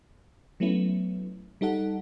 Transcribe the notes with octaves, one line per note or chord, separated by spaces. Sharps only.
F#3 A3 B3 C#4 E4
G3 D#4 A4 F#5